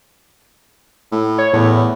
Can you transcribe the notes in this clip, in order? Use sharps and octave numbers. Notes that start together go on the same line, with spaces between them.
A2
C#5
E2 A2